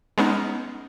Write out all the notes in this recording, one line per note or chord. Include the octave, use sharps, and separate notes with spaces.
G#3 B3 C#4 D#4